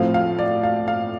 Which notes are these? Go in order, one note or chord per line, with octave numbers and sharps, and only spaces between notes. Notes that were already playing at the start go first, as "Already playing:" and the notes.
Already playing: A2 F3 C4 F5
F5
D5
F5
F5